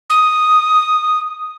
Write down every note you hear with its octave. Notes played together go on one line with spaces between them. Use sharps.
D#6